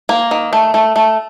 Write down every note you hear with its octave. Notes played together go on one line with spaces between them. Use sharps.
A#3
D#3
A3
A3
A3